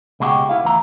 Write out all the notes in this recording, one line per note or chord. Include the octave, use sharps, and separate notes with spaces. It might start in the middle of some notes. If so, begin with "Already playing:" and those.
C#2 B2 G#3 F#4 G4
B3 E4 F5
D2 E3 A#5